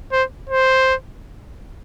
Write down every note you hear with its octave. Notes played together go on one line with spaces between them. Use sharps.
C5
C5